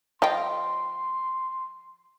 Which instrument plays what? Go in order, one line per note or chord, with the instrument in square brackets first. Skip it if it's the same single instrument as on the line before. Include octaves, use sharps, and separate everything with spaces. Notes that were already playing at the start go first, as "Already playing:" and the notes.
[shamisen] F3 G5 [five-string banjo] D#5 F5 [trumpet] C6